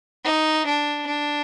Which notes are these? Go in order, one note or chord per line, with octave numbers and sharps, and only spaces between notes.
D#4
D4
D4